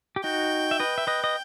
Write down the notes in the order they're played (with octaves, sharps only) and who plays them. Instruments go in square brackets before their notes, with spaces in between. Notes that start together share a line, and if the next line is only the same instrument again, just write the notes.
[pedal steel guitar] G4
[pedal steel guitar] D#4 F#4 [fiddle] G5
[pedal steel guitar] E5
B4 D#5
E5
B4 D#5
D#5